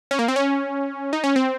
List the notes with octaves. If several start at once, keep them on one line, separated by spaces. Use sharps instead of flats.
C#4
A#3
C4
C#4
D#4
C#4
C4